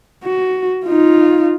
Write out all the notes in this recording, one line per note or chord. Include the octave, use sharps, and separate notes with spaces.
F#4
D#4 F4